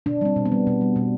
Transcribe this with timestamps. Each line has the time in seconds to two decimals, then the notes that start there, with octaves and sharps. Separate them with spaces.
0.06 B2 D4
0.21 G3 C4
0.36 B2
0.46 B3
0.52 G3
0.67 B2
0.81 G3
0.96 B2